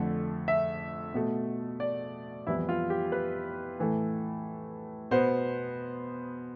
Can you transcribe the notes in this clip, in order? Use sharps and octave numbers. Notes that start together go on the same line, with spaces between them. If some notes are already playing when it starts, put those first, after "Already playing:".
Already playing: F2 D3 A3
E5
B2 A3
D5
F2 E3 G3 B3 E4
F4
G4
B4
A2 E3 A3
B2 B3 C5